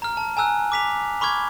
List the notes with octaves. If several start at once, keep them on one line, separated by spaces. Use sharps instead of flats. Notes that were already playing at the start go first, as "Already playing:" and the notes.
A#5 F6
A5
G#5 A#5 E6 F#6
D6 B6 F7
B5 C#6 D6 F6 G#6